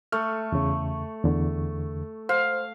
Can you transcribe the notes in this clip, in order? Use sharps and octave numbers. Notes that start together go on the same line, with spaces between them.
A3 F6
E2 C#3
E2 D3
C5 F5